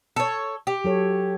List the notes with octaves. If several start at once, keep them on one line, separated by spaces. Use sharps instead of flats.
A4 C#5
G4
F#3 A4 C#5